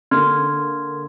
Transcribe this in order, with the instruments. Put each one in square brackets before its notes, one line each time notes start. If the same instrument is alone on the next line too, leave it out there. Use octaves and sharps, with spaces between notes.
[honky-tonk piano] D3 A#3 [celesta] C6 F6 G#6